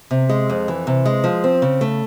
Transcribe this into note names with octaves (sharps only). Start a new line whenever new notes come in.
C3
G#3
F2
E3
C3
G#3
F3
C4
C#3
A3